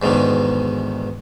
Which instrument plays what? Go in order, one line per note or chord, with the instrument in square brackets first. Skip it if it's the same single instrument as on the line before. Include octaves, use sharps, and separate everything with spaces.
[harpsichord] E2 G#2 B2 D3 D#3